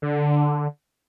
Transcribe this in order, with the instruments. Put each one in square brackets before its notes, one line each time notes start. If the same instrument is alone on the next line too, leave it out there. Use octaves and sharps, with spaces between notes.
[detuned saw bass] D3